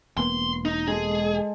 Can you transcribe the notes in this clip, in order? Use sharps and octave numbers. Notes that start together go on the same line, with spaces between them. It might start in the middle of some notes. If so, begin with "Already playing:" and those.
E1 A#3 B3 C6
D#4
G#3 G#4 A4